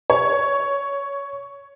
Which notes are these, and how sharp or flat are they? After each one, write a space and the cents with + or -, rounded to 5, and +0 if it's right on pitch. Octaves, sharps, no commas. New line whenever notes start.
C#5 +10